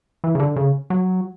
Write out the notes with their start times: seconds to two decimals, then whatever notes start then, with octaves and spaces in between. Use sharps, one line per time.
0.24 E3
0.35 C#3
0.40 D3
0.56 C#3
0.90 F#3